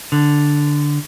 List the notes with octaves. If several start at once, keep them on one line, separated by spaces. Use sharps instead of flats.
D3